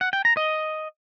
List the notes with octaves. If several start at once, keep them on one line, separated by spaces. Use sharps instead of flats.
F#5
G5
A#5
D#5